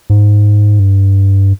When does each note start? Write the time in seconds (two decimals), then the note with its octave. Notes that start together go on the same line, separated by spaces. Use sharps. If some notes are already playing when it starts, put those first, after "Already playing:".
0.10 G#2
0.80 G2